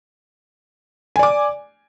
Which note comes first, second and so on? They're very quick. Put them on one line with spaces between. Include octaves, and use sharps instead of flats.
G#5 D5 D6